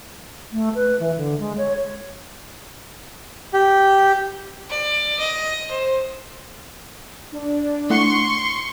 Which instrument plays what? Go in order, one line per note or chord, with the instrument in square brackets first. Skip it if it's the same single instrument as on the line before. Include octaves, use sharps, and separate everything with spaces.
[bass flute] A3
B4
E3
D3
G#3
C#5
[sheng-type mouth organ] G4
[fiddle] D5
D#5
C5
[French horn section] D4
[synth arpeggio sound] A3 E4 F#5 [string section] C6 C#6